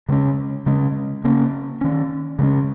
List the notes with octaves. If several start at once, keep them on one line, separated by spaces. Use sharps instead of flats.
C#3 G#3 C#4
C#3 G#3 C#4
C#3 A#3 C#4
D#3 C#4
C#3 G#3 C#4